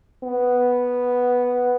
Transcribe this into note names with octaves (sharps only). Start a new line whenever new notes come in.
B3